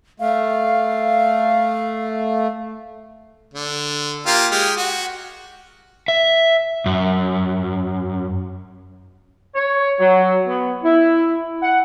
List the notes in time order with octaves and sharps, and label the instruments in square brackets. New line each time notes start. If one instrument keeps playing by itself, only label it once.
[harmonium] A3 [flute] F5
[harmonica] D3
A#3 F4 G4
G#3 G4 F6
F#4
[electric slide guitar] E5
F#2
[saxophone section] C#5
F#3
B3
E4
F#5